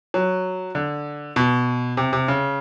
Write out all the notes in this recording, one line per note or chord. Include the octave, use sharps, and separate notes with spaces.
F#3
D3
B2
C3
C3
C#3